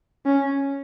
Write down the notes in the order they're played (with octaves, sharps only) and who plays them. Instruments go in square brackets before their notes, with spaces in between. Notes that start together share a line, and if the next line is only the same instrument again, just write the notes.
[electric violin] C#4